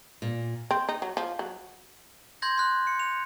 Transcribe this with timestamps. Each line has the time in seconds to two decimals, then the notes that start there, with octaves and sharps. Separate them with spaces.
0.22 A#2
0.71 C4
0.89 D#4
1.02 F#3
1.17 F3
1.39 F#3
2.42 C6 G6 G#6 A#6
2.58 C6 F#6
2.87 C#7
3.00 F7